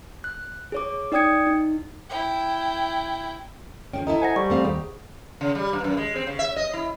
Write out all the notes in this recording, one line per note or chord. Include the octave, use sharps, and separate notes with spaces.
F#6
G#4 C#5 D6
D#4 D5 G5 D#6 G#6 C#7
D#4
E4 G5
F3 G#3 C#4 G5
E4 A4 D#5 A#5
C5 F#5 G#5 A#6
G3 C#6
A3 C4 F5
D#2 G4 G#4
C#3
G3
G2
F#2
G#3
C4
C#3
E5
D#5
E4